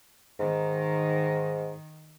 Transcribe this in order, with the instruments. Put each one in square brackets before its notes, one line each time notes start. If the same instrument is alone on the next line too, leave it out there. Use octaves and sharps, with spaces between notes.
[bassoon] G#2 [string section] D#3